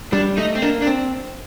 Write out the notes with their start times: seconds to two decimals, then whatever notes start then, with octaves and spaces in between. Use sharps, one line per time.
0.13 G3 D4
0.37 A3 D#4
0.55 C4
0.62 A#3 D4
0.82 D4
0.87 C4